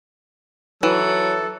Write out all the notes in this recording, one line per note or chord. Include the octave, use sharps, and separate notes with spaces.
E3 F#3 A4